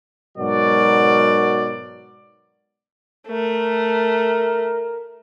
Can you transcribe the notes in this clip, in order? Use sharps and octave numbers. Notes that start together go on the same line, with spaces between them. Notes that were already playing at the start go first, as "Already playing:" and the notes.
G#2 B2 F#3 F#4 A#4 D5
A3 A#4